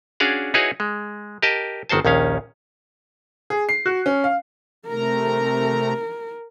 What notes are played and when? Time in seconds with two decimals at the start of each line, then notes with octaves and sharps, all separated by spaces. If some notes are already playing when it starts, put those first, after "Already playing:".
0.20 C#4 D4 F#4 G#4 D5 F5
0.54 D#4 E4 F#4 G#4 B4 C#5
0.80 G#3
1.42 G4 A#4 D#5 A5
1.89 G1 D#3 F#4 C5 A5
2.05 A#1 D#2 D#3 C#4 F5
3.50 G#4
3.69 C7
3.86 F#4
4.06 C#4
4.24 F5
4.88 C3 A3 A#4 A#5